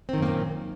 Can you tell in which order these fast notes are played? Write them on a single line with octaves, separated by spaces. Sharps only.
C4 D#3 F#2 A#3 A#2